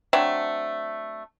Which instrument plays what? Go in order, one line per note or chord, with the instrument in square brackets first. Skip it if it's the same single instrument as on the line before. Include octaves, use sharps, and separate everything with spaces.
[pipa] F#3 A3 C4 D4